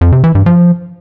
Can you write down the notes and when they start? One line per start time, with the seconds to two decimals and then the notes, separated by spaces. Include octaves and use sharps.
0.01 F2
0.12 C3
0.24 E3
0.35 G2
0.46 F3